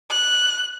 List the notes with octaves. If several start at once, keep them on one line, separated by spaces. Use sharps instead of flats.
F#6